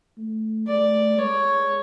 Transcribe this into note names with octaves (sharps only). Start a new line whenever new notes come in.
A3
A3 D5
G#3 C#5